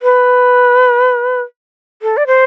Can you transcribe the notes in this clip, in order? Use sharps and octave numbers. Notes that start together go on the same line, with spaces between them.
B4
A4
D5
C5